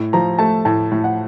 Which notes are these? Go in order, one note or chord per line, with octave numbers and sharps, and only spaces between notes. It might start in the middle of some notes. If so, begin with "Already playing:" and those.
Already playing: A2
F3 A#5
A3 A5
A2 A5
A2
F#5